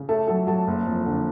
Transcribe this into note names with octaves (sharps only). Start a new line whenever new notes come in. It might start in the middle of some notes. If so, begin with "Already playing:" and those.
Already playing: C#3
A3 A4 A5
F#3 A4 A5
F#3 A4 A5
F#1
F2
D3